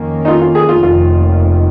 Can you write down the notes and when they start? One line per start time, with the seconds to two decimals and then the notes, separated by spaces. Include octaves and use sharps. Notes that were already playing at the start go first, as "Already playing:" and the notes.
Already playing: F2 D#3 A#3 C#4
0.25 D#4
0.28 F4
0.42 F4
0.55 G#4
0.69 F4
0.83 F1 D#2 D#3 F4